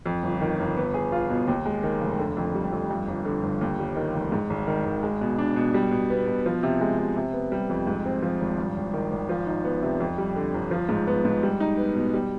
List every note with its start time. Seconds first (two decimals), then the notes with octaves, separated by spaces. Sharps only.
0.06 F2
0.23 G1
0.41 D#3
0.59 G1
0.76 B3
0.94 G#4
1.12 F4
1.30 B2
1.48 D#2
1.66 G#3
1.83 D#3
2.01 F1
2.19 D3
2.37 F2
2.55 G3
2.72 F2
2.90 G2
3.08 G1
3.25 D3
3.43 G1
3.61 D#2
3.79 G3
3.96 D#3
4.14 F1
4.32 G#2
4.50 G#1
4.67 D#3
4.85 G#1
5.03 G#3
5.21 B2
5.38 D4
5.56 B2
5.74 G3
5.91 B2
6.10 B3
6.27 B2
6.46 F3
6.63 C3
6.81 G#3
6.98 C3
7.16 C3
7.33 B3
7.52 G3
7.69 F2
7.87 G#2
8.05 C4
8.23 F3
8.41 G#1
8.58 G2
8.76 G#1
8.94 D#3
9.11 G#1
9.29 F3
9.47 D#4
9.65 B3
9.82 C3
10.00 F2
10.18 G3
10.36 D3
10.54 G1
10.71 F3
10.89 G#2
11.07 B3
11.25 G#2
11.43 G3
11.60 D#4
11.78 B3
11.96 B2
12.14 G3